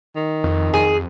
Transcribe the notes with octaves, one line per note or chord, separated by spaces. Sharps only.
D#3
F2
F2 G#4